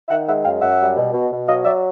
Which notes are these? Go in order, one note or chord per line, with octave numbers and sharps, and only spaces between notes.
D#3 E5 F#5
G#3 E5 F#5
F#2 F5 G5
F#2 E5 F#5
G3
B2
B2
B2
F#3 D#5 F5
F#3 D5 E5